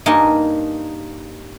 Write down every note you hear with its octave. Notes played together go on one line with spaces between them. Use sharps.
G2 A#3 D#4 G#5 A5